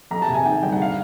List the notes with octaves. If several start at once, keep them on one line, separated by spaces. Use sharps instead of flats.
F2 A#5
A5
C3
G#5
D#3 G5
G1 G5
F#5
F5